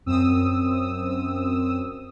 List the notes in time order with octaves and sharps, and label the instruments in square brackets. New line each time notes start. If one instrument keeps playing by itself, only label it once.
[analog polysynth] F#2 C4 D#6 E6